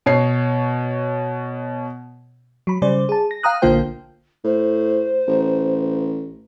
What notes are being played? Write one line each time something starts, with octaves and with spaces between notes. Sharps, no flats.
B2 C#5 C7
F#3 B5
C#3 G3 C5 D5
G#4 A5
A#6
F5 G5 A#5 D#6 F#6
A#1 D3 A#3 F4 C5 G5
A2 C5
A1